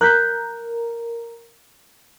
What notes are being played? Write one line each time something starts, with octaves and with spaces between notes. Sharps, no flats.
A#4 F#6 G6 B6